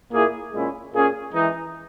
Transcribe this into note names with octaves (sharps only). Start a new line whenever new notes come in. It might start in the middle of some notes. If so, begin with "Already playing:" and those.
A#2 A#3 E4 G#4
A#2 G#3 C#4 E4
A#2 A#3 C#4 G#4
E3 G#3 D#4